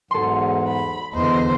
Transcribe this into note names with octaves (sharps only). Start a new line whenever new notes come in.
E2 G#2 F#3 A4 C6
B5
E2 D3 C5 D#5